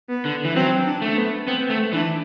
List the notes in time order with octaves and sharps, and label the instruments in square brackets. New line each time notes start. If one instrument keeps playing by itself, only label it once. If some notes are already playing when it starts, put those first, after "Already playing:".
[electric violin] B3
[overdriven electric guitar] D3
E3
[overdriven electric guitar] F#3 [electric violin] C4
[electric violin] D4
[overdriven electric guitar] A3
[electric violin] B3
[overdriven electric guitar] B3 [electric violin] C4
[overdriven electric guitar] A3
[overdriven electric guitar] E3 [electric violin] D4